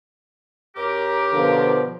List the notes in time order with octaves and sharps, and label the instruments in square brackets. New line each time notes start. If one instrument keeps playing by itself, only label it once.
[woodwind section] F#2 G4 A#4
[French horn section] B2 D3 F3